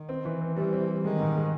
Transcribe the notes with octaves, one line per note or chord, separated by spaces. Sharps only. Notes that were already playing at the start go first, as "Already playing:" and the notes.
Already playing: D#3
C4
E3
C4
E3 G3
C4
G3
D#3 G#3
G#2
G#3